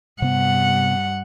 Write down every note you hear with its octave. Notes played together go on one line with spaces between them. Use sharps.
G2 C3 B3 F#5